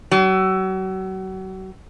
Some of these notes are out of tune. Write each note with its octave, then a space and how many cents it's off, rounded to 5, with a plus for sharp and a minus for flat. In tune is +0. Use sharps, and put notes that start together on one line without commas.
F#3 +35